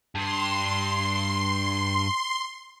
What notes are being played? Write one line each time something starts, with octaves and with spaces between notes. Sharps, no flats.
G2 C6